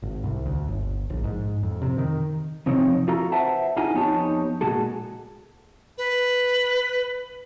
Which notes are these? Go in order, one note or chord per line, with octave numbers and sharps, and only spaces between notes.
G#1
C2
D2
G1
A#1
G#2
F2
C3
D#3
F2 C3 F3 C4 D#4 C#5
F4 F#4 A4 F5 A#5
B4 C5 E5 F#5 A5
D4 D#4 F4 G#4 F#5 G#5
F2 B3 D#4 G4 C#5 A5
A#2 G#3 F#4 G#4 A4
B4